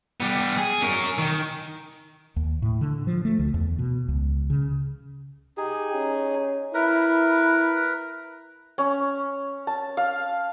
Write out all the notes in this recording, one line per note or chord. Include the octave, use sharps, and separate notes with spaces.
G3 B3
G#4
C#4 A#4
D#3
D#2
A2
D3
F3
A3
D2
E2
B2
C#2
C#3
D#4 G4 G#4
C#4
E4 A#4 B4
C#4
A5
F5